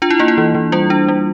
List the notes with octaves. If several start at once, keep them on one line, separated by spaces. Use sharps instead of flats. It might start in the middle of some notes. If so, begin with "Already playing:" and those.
D4 F4
E4
A#3 F4
E4
E3
E3
G3 F4
D4
G3